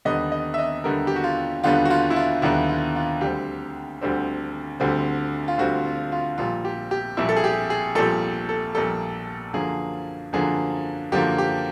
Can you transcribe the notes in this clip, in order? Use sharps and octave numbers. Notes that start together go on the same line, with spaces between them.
D#2 D3 G3 B3 D#5
D#5
E5
D#5
D#2 D3 G3 B3 A#4
G4
F#4
F4
D#2 D3 G3 B3 F4
F#4
F4
E4
F4
D#2 D3 G3 B3 E4
F4
F4
D2 D3 G3 C4 G4
D2 D3 G3 C4
D2 D3 G3 C4
F4
D2 D3 G3 C4 F#4
F4
F4
A#1 A#2 G3 F4
G4
G4
A#1 A#2 G3 E4
A4
G#4
G4
G#4
A#1 A#2 G3 A4
A4
A#1 A#2 G3 A4
F#2 D3 F3 A#3 G#4
F#2 D3 F3 A#3 G#4
F#2 D3 F3 A#3 G4
G4